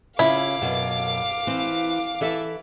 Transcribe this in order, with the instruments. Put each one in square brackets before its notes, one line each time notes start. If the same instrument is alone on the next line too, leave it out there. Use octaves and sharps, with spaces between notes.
[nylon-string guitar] C#3 F4 [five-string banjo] E4 [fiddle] F5 D6
[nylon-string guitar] F#2 B2
E3 C4
E3 A4 E5